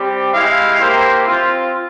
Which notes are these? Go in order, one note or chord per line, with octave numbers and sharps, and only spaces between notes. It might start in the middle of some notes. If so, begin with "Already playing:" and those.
Already playing: G3 C4 G4
G#3 E4 G4 F5
A#3 E4 G4 C5
C4 F4